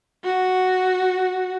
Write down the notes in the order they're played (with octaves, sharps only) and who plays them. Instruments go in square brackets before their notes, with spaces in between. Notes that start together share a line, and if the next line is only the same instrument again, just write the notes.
[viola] F#4